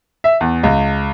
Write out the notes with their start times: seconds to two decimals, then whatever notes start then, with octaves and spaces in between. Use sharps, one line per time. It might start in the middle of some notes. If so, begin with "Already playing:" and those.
0.24 E5
0.40 E2
0.63 C#2